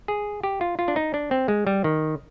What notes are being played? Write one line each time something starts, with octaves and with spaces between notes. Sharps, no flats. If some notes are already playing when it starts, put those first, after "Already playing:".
G#4
G4
F4
F4
D4
D#4
D4
C4
G#3
G3
D#3